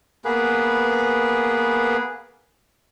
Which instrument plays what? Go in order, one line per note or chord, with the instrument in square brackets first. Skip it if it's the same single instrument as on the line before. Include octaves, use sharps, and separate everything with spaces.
[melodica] A#3 B3 G#4 B4